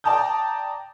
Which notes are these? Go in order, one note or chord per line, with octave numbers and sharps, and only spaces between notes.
D5 G5 A5 A#5 D#6 G6